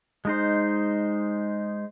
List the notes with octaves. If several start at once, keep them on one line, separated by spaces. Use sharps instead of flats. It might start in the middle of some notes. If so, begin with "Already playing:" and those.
G#3 D#4 C5